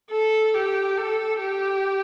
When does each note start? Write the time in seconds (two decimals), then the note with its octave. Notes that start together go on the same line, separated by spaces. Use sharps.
0.11 A4
0.54 G4
0.97 A4
1.40 G4